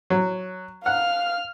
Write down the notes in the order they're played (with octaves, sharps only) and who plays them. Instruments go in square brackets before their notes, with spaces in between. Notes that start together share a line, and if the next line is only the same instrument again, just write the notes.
[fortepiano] F#3
[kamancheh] F5 F6 [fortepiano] F#5